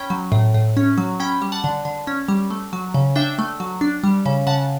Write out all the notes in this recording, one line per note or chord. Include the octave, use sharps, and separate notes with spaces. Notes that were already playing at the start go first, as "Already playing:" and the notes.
Already playing: C#4 G5 B5
F#3
A2
A2
C#4
F#3
C#4 G5 B5
G3
F#5 A5
D3
D3
C#4
G3
A3
F#3
C#3
D4 E5 G5
A3
F#3
D4
G3
C#3
C#3 F#5 A5